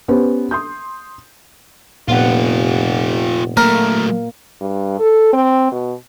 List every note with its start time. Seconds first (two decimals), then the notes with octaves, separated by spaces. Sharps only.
0.08 B3 C#4 G4 B4 C5
0.51 C6 D#6 G6
2.08 F1 A#2 B3 F4 G4 F#5
3.57 F#3 A3 A#3 A#4
4.61 G2
4.99 A4
5.33 C4
5.72 B2